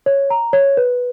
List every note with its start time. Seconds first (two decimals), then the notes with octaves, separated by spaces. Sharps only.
0.06 C#5
0.30 A#5
0.53 C#5
0.77 B4